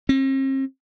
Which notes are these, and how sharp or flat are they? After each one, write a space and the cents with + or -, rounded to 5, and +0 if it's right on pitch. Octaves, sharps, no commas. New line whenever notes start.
C4 +45